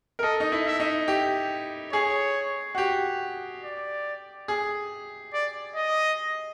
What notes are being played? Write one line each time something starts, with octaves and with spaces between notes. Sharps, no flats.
A#4
A4 D#5
D#4
E4
E5
D#4
G4
G#4 C#5
F#4
G4
D5
G#4
D5
D#5